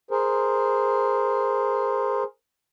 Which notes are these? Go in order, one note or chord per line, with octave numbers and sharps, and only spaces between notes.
G#4 A#4 C5